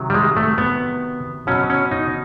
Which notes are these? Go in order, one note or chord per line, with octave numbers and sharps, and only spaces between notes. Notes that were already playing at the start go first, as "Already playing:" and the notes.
Already playing: C3 D#3 F#3
G3
G#3
A3
B3
B2 F#3 C#4
C#4
D#4